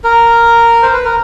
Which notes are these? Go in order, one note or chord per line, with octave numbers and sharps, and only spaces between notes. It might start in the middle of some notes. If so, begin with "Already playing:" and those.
A#4
C5
B4
A#4